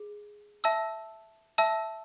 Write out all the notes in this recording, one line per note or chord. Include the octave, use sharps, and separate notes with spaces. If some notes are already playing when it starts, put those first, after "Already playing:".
Already playing: G#4
E5 A5 E6
E5 A5 E6